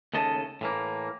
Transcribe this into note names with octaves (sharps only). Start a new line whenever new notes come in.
D#2 C#3 A3 D#5 A5
A2 E3 A#3